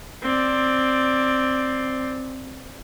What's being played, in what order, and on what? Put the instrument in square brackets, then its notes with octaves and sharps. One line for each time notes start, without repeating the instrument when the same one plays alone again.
[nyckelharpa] C4 D5